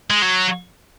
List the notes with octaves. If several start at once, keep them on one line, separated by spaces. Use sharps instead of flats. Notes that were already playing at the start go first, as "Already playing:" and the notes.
G#3
F#3